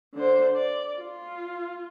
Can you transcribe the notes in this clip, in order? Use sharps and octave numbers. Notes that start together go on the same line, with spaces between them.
D3 C5
D5
F4